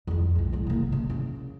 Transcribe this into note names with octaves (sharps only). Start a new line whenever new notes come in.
F2 F3
B1 G#2
E2 G#2
C3 A#3
C#3
C#3